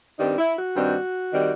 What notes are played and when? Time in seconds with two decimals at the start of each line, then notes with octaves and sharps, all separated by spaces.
0.19 G2 D#3 G3 C4 D#4
0.38 E4
0.57 F#4
0.75 G2 D#3 G3 C4
1.32 D#3 G3 C4